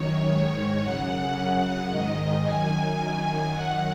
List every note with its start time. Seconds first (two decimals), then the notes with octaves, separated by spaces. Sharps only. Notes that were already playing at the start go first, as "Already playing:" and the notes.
Already playing: F#2 D#3 C#5
0.28 G#2 D#3
0.81 F#2 C#3 F#5
1.36 F#2 C#3
1.89 G#2 D#3 D#5
2.43 F#2 D#3 G#5
2.99 F#2 D#3
3.53 F#2 D#3 F#5